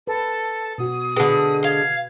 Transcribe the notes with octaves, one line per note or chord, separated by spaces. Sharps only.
A4 B4
B2 F#4 D#6
D3 G#3 B4
F5 G#6